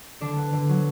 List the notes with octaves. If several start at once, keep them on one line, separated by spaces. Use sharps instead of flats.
D3 D4
B3
D3
F#3